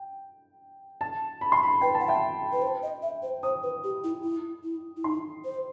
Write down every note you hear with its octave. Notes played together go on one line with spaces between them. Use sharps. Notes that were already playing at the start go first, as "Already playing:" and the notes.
Already playing: G5
A5
B5
C6
B5
B4 G5
A5
F#5
E5 G5
B4
C5
D#5
E5
C5
C5 D#6
B4
G4
E4
E4
E4
E4
D#4 C6
C5